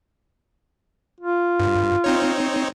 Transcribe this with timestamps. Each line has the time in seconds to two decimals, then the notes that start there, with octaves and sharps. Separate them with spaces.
1.20 F4
1.60 G2
2.04 C4 D#4 C#5